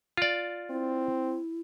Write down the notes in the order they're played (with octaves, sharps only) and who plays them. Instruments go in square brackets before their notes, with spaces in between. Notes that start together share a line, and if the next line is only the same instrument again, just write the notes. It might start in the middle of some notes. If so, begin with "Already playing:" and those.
[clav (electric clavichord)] F4 D5
[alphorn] C4 [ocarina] E4